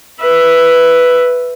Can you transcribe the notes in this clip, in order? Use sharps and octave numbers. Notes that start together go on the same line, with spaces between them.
B4 E5